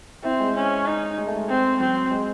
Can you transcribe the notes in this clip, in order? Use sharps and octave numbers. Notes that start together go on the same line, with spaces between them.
C4 E4
G#3
C#4
D#4
G#3
A3
G#3
C4
F#3 C4
G#3